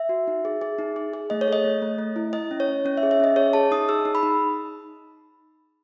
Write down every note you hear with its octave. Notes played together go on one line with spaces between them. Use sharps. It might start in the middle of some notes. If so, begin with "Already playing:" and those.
Already playing: E5
F#4
D#4
G#4
G#4
D#4
G#4
G#4
A3 D#5
C#5
A4 D#5
A3
A3
A3
E4
E4 D#5
C#4
C#5
C#4
C#4 C#5
E5
G#4
E5
C#4 D#5
G#4 C#5
G#4 A5
D#4 D#6
G#4 E6
D#4
B5
D#4